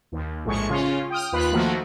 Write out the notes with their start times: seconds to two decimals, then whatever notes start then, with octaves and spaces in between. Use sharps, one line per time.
0.12 D#2
0.45 A#1 A2 G#3 C#6
0.70 C#3 C#4 F4
1.10 G5 D#6 F6
1.32 D#2 F4 B4 B5 F#6
1.52 D#3 F3 A3 A#3 F#4